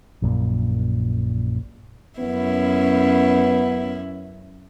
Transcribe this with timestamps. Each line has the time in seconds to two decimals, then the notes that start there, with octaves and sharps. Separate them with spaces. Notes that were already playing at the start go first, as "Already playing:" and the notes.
0.22 A#1 F#2 A#2
2.19 F#2 B3 C#4 E4